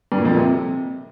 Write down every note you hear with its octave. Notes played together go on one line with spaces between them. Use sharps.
G2
A#2
F2
A#2
C3